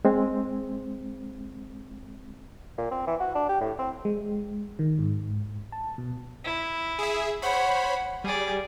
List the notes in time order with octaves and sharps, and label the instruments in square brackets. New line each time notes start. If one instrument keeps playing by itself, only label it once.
[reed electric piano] G#3 C4
[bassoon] A#2
C4
E3
F#4
D4
G4
A2
C4
[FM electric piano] G#3
D#3
G#2
A5
B2
[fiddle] E4
[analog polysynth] G#4 E5
[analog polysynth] C5 C#5 B5 [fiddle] F#5
[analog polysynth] G3 [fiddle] G#4 D5